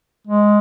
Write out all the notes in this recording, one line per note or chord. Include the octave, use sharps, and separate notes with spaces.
G#3